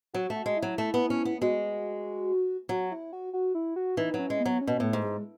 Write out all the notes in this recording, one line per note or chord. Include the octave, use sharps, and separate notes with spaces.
F#3 F#4
A3
F#4
G#3
E4
F#3
A3
B3
C#4
B3
G#3 F#4
F#3 F#4
E4
F#4
F#4
E4
F#4
E3 D#4
F#3
C#4
G#3
B3
F#3
C#4
B2
A2 A3
G#2
G#3